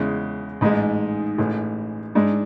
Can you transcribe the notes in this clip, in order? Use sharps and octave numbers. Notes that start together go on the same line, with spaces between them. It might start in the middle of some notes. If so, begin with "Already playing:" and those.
Already playing: E2 C#3 G#3
A1 G#2 G#3
A1 A2 E3 G#3
G#2 G#3 D4